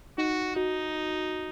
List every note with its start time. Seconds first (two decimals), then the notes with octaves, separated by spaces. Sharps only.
0.18 D#4 F#4
0.56 D#4 F#4